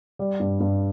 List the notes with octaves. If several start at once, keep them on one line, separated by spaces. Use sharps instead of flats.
G3
G2
G2